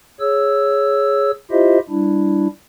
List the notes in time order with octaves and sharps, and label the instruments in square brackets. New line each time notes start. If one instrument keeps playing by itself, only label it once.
[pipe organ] G#4 C#5 E6
E4 F4 G4 C5 D#5 E5
G3 D4 E4